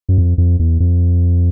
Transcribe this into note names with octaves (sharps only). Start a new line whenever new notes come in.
F#2
F2
F2
E2
F2